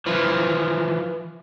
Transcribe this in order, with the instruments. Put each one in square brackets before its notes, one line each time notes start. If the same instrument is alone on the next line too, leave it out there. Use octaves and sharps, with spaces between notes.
[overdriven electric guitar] E3 F3